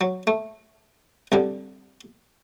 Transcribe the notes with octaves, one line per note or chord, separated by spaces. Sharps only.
F#3
A3
C2 D3 G3